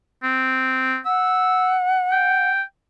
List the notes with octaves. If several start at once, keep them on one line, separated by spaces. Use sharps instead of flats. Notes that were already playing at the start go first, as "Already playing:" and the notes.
C4
F#5 E6
G5